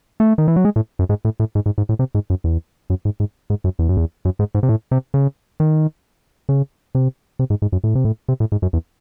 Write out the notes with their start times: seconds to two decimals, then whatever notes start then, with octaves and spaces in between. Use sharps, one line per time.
0.20 A3
0.38 D#3
0.48 E3
0.56 F#3
0.65 G#3
0.76 A2
0.99 F#2
1.09 G#2
1.25 A2
1.40 A2
1.55 G#2
1.66 G#2
1.78 G#2
1.89 A2
1.99 C3
2.15 G#2
2.30 F#2
2.44 E2
2.90 F#2
3.05 G#2
3.20 G#2
3.50 G#2
3.64 F#2
3.79 E2
3.89 F#2
3.97 E2
4.25 F#2
4.39 G#2
4.55 G#2
4.63 C3
4.69 A2
4.91 C3
5.14 C#3
5.60 D#3
6.49 C#3
6.95 C3
7.39 C3
7.50 G#2
7.62 G#2
7.72 F#2
7.84 A2
7.95 C3
8.05 A2
8.28 C3
8.40 A2
8.52 G#2
8.62 F#2
8.73 E2